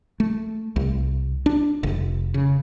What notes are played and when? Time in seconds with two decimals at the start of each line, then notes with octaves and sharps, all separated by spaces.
0.20 A3
0.76 C2
1.46 D4
1.83 F1
2.34 C#3